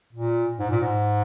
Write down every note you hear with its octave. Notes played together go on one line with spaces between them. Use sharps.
A#2
G#2
A#2
G#2